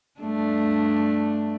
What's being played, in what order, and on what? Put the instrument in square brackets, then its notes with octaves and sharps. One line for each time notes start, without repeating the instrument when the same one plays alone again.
[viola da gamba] G2 A3 D4